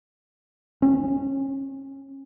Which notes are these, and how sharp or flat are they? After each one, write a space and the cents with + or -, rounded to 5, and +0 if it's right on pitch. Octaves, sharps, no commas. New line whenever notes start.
C#4 -30